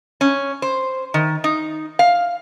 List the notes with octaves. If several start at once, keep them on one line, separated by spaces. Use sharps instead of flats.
C#4
C5
D#3
D#4
F5